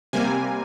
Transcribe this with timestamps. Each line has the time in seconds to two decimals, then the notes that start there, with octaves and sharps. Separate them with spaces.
0.13 C3 G3 A#3 G#5